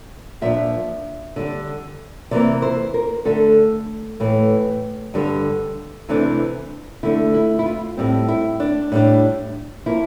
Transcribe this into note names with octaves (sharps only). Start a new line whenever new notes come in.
A#2 F3 A#3 D4 E5
D3 G3 D4
C3 E3 A#3 D5
C5
A#4
D3 A3 D4 A4
A2 E3 A3
G2 D3 G3
C3 E3 A3 D4
D3 A3 D4 E4
E4
E4
F4
A2 G3 C4
E4
D4
A2 G3 D4
F3 A#3 E4